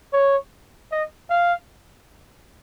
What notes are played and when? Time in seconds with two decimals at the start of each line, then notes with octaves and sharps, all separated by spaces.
0.13 C#5
0.92 D#5
1.30 F5